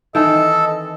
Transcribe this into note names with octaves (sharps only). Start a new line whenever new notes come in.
D#3 E3 C4 A4 D#5